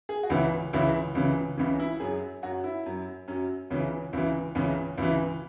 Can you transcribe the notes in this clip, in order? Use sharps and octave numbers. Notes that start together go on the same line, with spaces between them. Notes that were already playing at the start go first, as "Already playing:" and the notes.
G#4
F#4
C#2 C#3 E3 E4
C#2 C#3 E3 E4
C#2 C#3 E3
C#2 C#3 E3 C#4
E4
F#2 F#3 G#4
F#2 F#3 F#4
E4
F#2 F#3
F#2 F#3 C#4
C#2 C#3 E3 C#4
C#2 C#3 E3 E4
C#2 C#3 E3 C#4
C#2 C#3 E3 E4